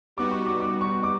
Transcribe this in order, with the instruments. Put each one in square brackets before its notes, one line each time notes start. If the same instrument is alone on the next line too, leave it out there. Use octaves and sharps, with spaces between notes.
[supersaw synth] G3 B3 D#4 F#4 [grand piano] D6
[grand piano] C#6
D6
D6
C#6
D6